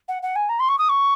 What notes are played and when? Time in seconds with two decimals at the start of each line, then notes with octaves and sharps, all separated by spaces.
0.08 F#5
0.23 F#5
0.36 G#5
0.49 A#5
0.60 C6
0.69 C#6
0.78 D#6
0.89 C#6